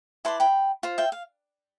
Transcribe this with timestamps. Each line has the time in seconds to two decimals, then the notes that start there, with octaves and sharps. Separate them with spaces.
0.25 E4 B4 D5 A5 C6
0.40 G5 B5
0.83 F4 C5
0.98 E5 G5
1.12 F5